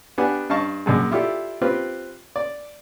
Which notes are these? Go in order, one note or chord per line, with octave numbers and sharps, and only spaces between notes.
B3 D4 G4 F#5 G#5
G2 D#5 F5 A5 C#6
A#1 F#2 G#3
E4 F4 G4 A4 D5
C4 F4 G4 B4
D5